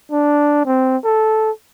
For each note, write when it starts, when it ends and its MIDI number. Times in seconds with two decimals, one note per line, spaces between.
0.12 0.64 62
0.66 0.97 60
1.04 1.51 69